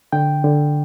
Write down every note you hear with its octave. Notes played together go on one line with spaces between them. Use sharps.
D3 G5
D3